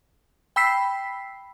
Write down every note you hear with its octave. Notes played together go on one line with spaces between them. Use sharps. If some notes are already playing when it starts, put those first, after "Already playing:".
G5 B5 E6 B6 C7